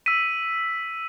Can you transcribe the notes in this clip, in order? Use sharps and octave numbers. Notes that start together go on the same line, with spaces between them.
E6 B6 D#7